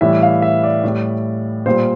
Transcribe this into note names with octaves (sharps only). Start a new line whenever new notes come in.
A2 E3 G3 E5
F5
E5
D5
A2 G3
A#2 G3 C5